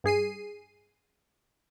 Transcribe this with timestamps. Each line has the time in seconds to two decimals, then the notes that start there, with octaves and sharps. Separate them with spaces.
0.04 G2 G#4 C7 D#7